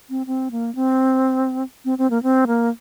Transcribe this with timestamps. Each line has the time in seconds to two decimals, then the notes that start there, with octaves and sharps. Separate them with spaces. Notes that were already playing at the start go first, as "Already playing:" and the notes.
0.10 C4
0.27 C4
0.51 A#3
0.75 C4
1.85 C4
1.98 C4
2.10 A#3
2.23 C4
2.47 A#3